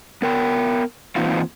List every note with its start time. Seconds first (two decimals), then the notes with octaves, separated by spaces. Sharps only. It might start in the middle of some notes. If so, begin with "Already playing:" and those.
0.22 B3 A#4 G5
1.16 E3 A#3 C4 D#4 F4 F5